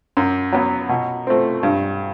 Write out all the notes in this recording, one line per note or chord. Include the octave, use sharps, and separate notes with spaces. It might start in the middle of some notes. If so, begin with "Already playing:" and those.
F#2
F#3 B3
B2
A3 C4
G2